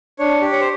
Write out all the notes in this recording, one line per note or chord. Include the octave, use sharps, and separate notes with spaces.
D4 C#5
G4
C#5
C5